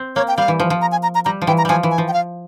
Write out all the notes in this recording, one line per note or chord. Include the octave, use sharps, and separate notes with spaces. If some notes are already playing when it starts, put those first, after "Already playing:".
Already playing: C4
A#3 C#5
G5
G3 F5
E3
F3
F3
A#5
G#5
A#5
A#5
G3 A#5
F3
E3 G5
A#5
F3 G3 G#5
E3
G#5
F3
G5
F5